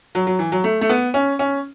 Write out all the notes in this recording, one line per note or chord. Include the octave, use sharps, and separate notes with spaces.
F#3
F#3
E3
F#3
A3
A3
B3
C#4
C#4